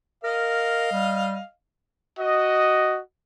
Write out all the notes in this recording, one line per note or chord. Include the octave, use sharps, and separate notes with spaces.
A#4 D#5 F5
G3
F#4 D#5